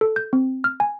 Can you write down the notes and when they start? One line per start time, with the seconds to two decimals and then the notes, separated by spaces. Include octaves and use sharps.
0.01 A4
0.16 G6
0.33 C4
0.64 F6
0.80 G#5